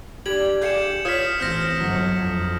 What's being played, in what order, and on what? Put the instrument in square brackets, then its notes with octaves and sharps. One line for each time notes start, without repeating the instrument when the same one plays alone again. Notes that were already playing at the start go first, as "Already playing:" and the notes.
[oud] G3 D4 G4 [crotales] G#6 F#7
[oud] G4 G#4 F5 [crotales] G6 C#7 E7
[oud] F4 C#5 F5 [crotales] D#6 F6 B6
[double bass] A1 C4 [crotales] F6 G6 A#6
[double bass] G1 F#3
F2